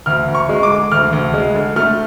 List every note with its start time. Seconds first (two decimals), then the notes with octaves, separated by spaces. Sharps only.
0.06 D2 F6
0.28 D2
0.35 C#6
0.49 G#3
0.63 D6
0.70 D3
0.92 D2 F6
1.13 D2
1.34 G#3
1.55 D3
1.76 A3 F6